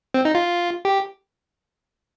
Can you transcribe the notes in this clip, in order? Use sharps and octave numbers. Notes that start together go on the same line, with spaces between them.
C4
D#4
F4
G4